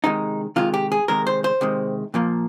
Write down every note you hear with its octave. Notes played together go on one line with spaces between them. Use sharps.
C3 D#3 G#3 D#4
C3 D#3 G#3 F4
G4
G#4
C3 D#3 G#3 A#4
C5
C5
C3 D#3 G#3
A#2 F3 A#3